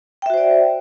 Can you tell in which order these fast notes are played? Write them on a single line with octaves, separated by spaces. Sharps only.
G5 E5 F#4 C5 D5